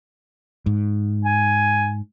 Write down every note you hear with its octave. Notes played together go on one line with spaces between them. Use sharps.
G#2
G#5